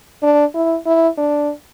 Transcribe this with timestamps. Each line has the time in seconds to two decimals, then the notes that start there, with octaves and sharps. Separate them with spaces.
0.23 D4
0.55 E4
0.86 E4
1.18 D4